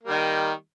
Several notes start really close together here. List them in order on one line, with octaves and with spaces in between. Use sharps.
A#3 G3 D#3